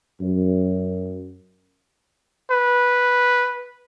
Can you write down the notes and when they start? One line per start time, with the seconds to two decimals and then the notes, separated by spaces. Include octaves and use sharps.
0.21 F#2
2.51 B4